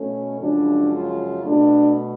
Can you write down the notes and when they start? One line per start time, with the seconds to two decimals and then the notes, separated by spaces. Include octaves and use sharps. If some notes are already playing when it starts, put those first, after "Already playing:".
Already playing: B2 A3 C#4
0.40 F#2 C#3 F3 G#3 D4
0.93 F4
1.44 B2 A3 D4